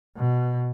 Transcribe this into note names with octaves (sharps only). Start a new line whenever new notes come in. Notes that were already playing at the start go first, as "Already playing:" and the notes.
B2